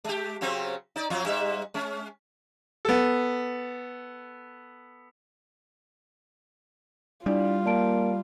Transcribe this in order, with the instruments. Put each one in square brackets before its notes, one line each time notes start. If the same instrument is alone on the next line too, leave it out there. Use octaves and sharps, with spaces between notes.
[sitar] G#3 G4
C#3 F#3 C4
D#4 D5
F2 F#3 F4
G#2 G3 E5
G#3 C#4
[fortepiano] B3 A4
[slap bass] G3 [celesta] D4 E4 D5 [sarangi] F4
[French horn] A#3 [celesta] D5 A5 D7